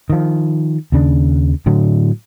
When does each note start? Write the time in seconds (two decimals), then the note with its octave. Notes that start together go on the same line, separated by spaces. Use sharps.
0.10 D#3 F3
0.92 D#2 C#3 D4
1.66 A2 D3 F#3